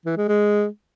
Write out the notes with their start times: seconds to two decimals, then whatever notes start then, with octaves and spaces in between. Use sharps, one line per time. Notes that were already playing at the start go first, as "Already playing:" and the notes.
0.06 E3
0.17 G#3
0.29 G#3